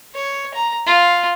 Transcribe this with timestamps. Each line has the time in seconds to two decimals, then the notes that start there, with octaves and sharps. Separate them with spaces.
0.15 C#5
0.54 A#5
0.87 F4